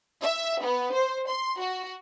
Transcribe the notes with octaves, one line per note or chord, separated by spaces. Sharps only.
E5
B3
C5
C6
F#4